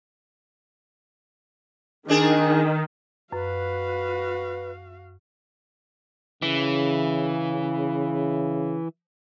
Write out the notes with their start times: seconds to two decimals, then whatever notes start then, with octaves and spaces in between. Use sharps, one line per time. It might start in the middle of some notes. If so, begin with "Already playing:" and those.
2.08 D#3 C4 D4 G#4
3.32 F#2 F#4 B4 F5
6.42 C#3 E3